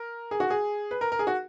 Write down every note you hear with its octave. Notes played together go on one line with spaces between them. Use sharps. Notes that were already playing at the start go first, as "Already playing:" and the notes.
Already playing: A#4
G#4
F#4
G#4
B4
A#4
A#4
G#4
F#4